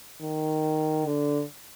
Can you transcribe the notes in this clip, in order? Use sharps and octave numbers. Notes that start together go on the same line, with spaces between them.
D#3
D3